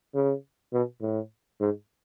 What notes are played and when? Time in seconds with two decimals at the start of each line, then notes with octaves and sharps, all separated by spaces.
0.14 C#3
0.73 B2
1.01 A2
1.60 G#2